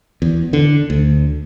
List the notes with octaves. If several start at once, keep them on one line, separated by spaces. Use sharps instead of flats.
E2
D3
D2